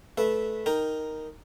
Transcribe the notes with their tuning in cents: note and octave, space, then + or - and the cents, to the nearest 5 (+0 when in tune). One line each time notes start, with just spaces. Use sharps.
A3 -15 B4 -10 E5 -5
D#4 +0 A#4 +0 G5 +0